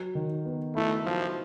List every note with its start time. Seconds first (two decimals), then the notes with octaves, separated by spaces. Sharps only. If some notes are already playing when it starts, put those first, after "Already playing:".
Already playing: F#3
0.15 D#3
0.45 B3
0.75 A3 E4
1.05 F3 F#3